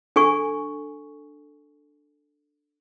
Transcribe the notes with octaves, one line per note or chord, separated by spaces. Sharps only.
D4 A4 G#5 C#6